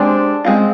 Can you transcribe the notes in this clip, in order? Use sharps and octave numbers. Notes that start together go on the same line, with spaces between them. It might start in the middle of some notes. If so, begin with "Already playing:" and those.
Already playing: G#3 C4 D4 G4 C5
G#3 C4 F4